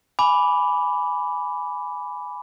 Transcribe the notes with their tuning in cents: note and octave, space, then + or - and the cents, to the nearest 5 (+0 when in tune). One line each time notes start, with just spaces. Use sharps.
G#5 +5 B5 +0 D6 -10